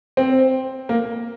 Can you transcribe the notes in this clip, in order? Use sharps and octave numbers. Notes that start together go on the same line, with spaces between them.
C4
A#3